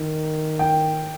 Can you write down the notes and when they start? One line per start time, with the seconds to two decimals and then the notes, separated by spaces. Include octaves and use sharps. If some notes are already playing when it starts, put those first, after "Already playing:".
Already playing: D#3
0.59 G5